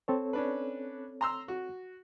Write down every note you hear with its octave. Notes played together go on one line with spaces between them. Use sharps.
C4 A4 C#5
C#4 D4 B4
A#5 C6 E6
F#4